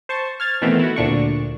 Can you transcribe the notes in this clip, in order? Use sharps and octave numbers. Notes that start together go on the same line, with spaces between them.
C5 A5 C#6
F6 G#6 A6
B2 D#3 E3 A3 B3 C4
E4 F#4
D2 A#2 D4 C#6